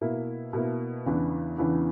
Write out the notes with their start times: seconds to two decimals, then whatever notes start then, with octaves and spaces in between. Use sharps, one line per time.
0.01 B2 A#3 E4
0.53 B2 A#3 E4
1.06 E2 C#3 E3 B3 D4
1.58 E2 C#3 E3 B3 D4